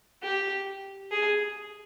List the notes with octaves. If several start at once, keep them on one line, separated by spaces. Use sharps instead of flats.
G4
G#4